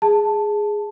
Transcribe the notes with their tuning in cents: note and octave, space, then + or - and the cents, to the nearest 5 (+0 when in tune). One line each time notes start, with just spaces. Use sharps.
G#4 +0 A5 +0